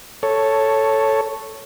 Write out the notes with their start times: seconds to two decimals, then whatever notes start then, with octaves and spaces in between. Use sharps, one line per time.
0.23 A4 C#5